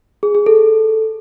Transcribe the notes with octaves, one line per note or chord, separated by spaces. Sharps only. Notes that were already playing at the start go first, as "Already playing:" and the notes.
G#4
G#4
A4